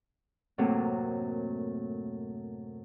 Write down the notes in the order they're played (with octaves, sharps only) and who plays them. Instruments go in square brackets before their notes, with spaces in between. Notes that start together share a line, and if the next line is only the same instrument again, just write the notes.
[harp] F#2 A2 C3 F#3 A3 A#3